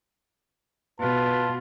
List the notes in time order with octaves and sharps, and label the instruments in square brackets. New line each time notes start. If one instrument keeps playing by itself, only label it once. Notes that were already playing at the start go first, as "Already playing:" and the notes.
[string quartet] B2 [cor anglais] F4 [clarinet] B4 [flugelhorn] A5